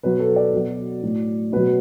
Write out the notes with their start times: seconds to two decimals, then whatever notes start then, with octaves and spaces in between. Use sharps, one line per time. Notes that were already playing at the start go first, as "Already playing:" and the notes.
0.03 B2 F#3 B4
0.19 A4
0.36 D5
0.53 B2 F#3
1.02 A2 F#3
1.52 B2 F#3 B4